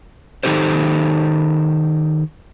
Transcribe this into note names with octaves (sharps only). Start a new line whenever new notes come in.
D#3 G#3 D#4 G4 A4 C5